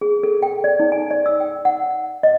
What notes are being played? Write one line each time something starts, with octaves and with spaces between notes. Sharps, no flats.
G#4
A4
G5
D5
D#4
G#5
D5
E6
G5
F#5
D#5